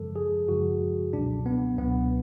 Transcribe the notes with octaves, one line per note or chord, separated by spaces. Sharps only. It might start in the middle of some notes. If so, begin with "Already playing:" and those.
Already playing: F#2 C#3 F3 G#3 A4
G#4
F#2 C#3 F3 G#3 F#4
C#2 B2 F#3 D4
B3
C#2 B2 F#3 B3